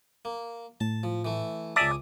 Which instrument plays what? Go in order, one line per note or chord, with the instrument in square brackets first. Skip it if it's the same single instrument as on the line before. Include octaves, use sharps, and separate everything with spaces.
[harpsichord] A#3
[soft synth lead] A2 [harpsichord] A5
[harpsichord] F3
E3 A3
[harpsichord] C#2 G#5 D#6 [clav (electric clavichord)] D5 E5 A5 [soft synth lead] D6